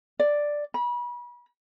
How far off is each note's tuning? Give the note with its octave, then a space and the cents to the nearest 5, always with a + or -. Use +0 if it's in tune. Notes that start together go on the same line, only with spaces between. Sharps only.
D5 +5
B5 -35